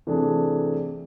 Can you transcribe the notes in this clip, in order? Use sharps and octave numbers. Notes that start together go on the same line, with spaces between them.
C3 E3 A3 D4 G#4